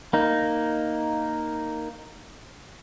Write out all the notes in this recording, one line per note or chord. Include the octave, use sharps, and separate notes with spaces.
A#3 D#4